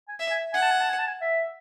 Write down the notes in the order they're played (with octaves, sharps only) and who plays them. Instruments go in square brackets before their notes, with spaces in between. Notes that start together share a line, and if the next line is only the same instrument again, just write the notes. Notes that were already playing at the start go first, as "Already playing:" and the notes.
[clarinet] G#5
[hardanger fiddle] E5
[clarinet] G#5
[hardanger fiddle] F#5 [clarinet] G#5
[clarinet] A5
G#5
A5
G#5
A5
G#5
E5